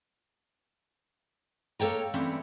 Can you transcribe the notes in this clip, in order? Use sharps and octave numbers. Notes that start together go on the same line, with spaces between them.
A#3 A4 C#5 G5 A#5
E3 G3 A3 C4 C#4